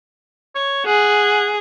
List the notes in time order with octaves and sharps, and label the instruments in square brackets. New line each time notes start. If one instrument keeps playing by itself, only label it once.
[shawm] C#5
[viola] G#4 [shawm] F#5